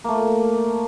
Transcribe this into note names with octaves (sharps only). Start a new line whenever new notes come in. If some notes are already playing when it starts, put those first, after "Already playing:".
A3 A#3